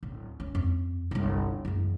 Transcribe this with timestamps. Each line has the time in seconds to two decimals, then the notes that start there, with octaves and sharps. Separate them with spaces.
0.03 D1
0.40 C#4
0.55 F2
1.11 G1 C2
1.65 F#1 E3